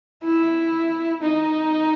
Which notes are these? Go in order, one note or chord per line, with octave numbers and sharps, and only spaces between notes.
E4
D#4